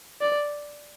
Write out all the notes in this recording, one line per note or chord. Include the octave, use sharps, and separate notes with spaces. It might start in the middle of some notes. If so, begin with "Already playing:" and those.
D5